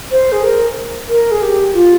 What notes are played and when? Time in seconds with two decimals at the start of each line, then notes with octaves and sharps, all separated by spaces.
0.11 C5
0.32 G#4
0.43 A#4
1.09 A#4
1.31 G#4
1.42 G4
1.74 F4